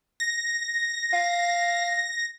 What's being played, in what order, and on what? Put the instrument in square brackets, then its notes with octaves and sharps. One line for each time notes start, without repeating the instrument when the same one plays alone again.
[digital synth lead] A#6
[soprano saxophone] F5